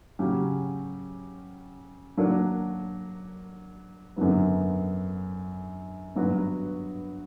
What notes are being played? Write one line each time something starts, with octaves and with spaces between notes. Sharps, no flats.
C#3 F#3 C#4 G4
F#3 A#3 D4
F#2 D3 F#3 B3
G2 F#3 B3 F#4 B4